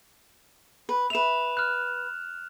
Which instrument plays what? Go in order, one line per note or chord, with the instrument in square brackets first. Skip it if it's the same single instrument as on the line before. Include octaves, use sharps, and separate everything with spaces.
[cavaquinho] B4
[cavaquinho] B4 E5 [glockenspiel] E7 F7
[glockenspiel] F6 F#6